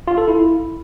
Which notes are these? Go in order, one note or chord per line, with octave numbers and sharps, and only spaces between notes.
F4
A4
E4